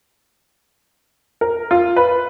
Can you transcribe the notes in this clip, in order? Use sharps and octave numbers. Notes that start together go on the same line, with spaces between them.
A#4
F4
B4